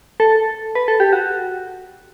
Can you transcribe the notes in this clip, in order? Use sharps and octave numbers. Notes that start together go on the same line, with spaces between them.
A4
B4
A4
G4
F#4